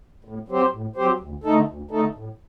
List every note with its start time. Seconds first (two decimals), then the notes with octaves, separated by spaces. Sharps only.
0.24 A2
0.48 F#3 C4 G4 C5
0.72 A2
0.96 F#3 C4 G4 C5
1.20 D2
1.44 D3 A3 D#4 A4
1.68 D2
1.91 D3 A3 D#4 A4
2.14 A2